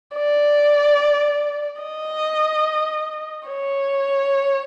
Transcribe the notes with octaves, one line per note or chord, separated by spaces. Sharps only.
D5
D#5
C#5